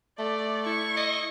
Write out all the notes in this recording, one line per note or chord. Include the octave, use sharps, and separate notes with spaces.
A3 D5
E4 C#6
D#5